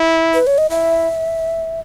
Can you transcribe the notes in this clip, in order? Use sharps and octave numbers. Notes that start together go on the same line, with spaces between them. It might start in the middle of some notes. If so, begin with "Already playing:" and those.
Already playing: E4
B4
C#5
D#5
E4 E5